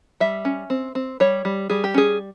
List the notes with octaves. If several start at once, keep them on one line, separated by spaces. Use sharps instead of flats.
G3 E5
C#4
C4
C4
G3 C#5
G3
G3 G#4
G4
C#4 G#4